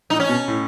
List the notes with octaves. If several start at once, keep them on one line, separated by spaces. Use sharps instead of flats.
A2 D#4
C#4
B2
A2